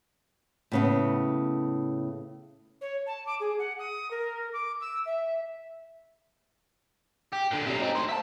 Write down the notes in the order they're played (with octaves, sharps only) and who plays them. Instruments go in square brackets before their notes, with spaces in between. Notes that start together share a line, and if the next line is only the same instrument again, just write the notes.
[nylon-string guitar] A2 C#3 B3
[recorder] C#5
A5
D6
G#4
F#5
D#6
A#4
D6
E6
E5
[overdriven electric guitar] G4
A#2 D3
C3 F#3
C4 D#4
A3 C5
E5 A5